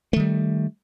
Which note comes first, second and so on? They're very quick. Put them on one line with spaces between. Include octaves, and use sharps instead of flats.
A3 D#3 G3